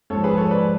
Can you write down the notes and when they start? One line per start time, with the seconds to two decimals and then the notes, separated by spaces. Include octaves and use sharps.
0.10 G#2 F3 A4 C#5
0.24 G#4 B4
0.37 A4 C#5
0.50 B4 D5